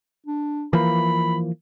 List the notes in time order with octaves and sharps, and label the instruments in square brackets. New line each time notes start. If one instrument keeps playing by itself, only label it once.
[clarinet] D4
[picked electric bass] E3 F3 A#3 [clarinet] B5